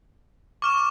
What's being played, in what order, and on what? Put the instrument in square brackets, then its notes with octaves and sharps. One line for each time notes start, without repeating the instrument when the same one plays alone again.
[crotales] C#6 F6 E7 [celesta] D6